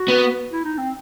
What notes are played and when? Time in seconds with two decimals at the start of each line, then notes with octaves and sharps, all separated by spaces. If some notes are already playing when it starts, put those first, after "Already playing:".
Already playing: F#4
0.08 B3
0.52 E4
0.64 D#4
0.78 C4